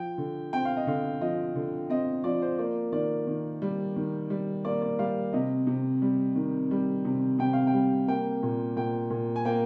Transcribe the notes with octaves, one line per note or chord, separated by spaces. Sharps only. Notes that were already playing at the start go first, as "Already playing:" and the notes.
Already playing: F3 G5
D3
C4 G5
F5
D#5
D3 F5
F3 D#5
D3
C4 D#5
F3 D5
C5
A#3 D5
D#3 D5
D#3
G3
D#3
G3
A#3 D5
D5
G3 F5
C3 D#5
C3
G3
D#3
G3
C3
C3 G5
F5
G5
G3
A#3 G5
A#2
A#2 G5
A#2
G#5
A#3 G5